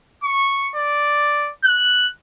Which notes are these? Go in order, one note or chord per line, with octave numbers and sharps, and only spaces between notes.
C#6
D5
F#6